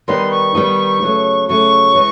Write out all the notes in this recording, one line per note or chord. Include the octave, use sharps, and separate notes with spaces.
D#3 G3 B3 D#4 C6
C#6
D#3 G3 B3 D#4
C#3 F#3 A3
C#3 F#3 A3 C#6
E3 G#3